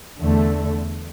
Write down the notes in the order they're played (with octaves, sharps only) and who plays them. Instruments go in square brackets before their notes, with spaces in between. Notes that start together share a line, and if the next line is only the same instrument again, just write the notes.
[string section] E2 D3 A3